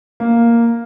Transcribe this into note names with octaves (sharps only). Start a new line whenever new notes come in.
A#3